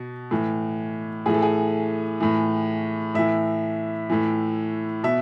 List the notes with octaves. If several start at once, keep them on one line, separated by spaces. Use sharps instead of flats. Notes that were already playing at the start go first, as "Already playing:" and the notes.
Already playing: B2
A2 E3
A2 E3 G#4
A4
G#4
A2 E3
A2 E3 E5
A2 E3
B2 E5